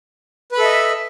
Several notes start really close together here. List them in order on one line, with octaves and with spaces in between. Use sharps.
B4 B5 A4 E5 D#5